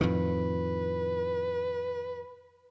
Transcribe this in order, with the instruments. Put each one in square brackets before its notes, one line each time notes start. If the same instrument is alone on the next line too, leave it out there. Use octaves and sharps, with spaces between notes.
[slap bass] F2 A2 D#3 [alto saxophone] B4